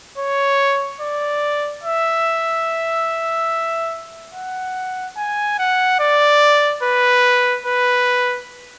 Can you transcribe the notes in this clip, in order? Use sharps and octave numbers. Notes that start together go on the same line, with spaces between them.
C#5
D5
E5
F#5
G#5
F#5
D5
B4
B4